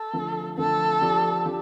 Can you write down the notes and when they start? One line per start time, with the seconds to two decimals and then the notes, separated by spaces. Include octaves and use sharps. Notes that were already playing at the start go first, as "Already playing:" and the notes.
Already playing: A4
0.13 D3 F3 A3
0.58 D3 F3 A3 A4
1.01 F3 D4 G4
1.45 F3 D4 G4